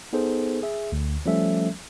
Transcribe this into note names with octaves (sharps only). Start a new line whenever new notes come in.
B3 D#4 G#4 A4 C5
G#4 E5
D2 D3
F3 G3 A3 C#4 A4 E5